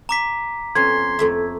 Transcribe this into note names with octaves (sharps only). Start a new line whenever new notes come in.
A#5 D6 B6
F2 B3 C#4 C6 G#6
F2 A3 E5